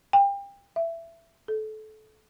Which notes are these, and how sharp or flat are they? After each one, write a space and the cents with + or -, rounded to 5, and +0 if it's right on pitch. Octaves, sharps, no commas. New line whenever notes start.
G5 +30
E5 +20
A4 -25